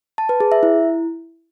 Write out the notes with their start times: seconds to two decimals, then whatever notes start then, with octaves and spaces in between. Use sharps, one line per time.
0.18 A5
0.29 B4
0.40 G#4
0.52 E5
0.63 E4